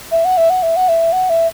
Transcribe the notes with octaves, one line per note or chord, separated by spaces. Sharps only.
E5
F#5
E5
F#5
E5
F#5
E5
F#5
E5